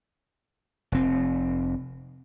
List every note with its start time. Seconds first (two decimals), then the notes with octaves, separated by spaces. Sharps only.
0.92 F1 C4